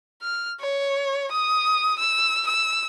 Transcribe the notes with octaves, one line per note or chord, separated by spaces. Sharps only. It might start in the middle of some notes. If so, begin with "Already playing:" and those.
F6
C#5
D#6
E6
E6